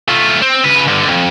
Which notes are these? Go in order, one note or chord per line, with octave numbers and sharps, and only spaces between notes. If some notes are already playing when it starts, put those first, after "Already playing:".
A3 F4
C4
C#3 B4
G2 D3
C2 F2